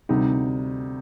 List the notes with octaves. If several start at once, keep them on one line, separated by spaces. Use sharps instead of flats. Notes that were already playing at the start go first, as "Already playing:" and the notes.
D2 C3 G3 D#4